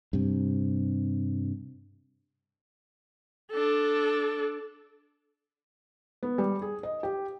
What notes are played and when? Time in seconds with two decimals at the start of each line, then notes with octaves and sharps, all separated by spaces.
0.13 G2 C3
3.51 D4 A4
6.23 B3
6.38 G3
6.62 G#4
6.83 D#5
7.03 G4